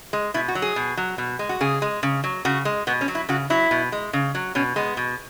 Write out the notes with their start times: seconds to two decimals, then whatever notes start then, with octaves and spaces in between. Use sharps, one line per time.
0.13 G#3
0.34 B2 E4
0.48 F#4
0.55 F#3
0.62 G#4
0.76 B2
0.97 F#3
1.18 B2
1.39 G#3
1.49 F#4
1.61 C#3 G#4
1.82 G#3
2.03 C#3
2.24 F#3
2.45 C#3 F#4
2.65 G#3
2.87 B2 B3
3.01 C#4
3.08 F#3
3.15 E4
3.29 C#3 F#4
3.50 F#3 E4
3.71 B2
3.92 G#3
4.13 C#3
4.35 F#3
4.55 B2 C#4
4.76 G#3 B3
4.97 B2